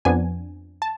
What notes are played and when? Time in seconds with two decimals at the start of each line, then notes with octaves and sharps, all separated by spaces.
0.05 F2 F3 B3 D4 G#5
0.82 A5